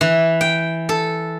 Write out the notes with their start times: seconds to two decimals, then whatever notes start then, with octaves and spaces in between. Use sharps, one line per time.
0.01 E3
0.41 G5
0.89 A4